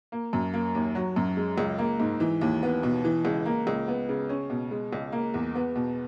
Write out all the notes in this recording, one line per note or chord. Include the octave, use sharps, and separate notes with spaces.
A#3
F#2
A#3
D#2
F#3
F#2
G#3
C#2
A#3
G#2
E3
D#2
B3
B2
E3
C#2
A#3
C#2
B3
C#3
C#4
B2
G#3
C#2
A#3
E2
B3
B2